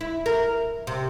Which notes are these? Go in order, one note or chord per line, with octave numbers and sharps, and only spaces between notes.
E4
A#4
C3